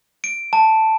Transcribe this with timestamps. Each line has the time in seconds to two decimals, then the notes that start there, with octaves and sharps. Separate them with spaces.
0.24 D7
0.53 A5